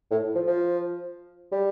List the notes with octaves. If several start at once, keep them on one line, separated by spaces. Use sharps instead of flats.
A2
F3
F3
G3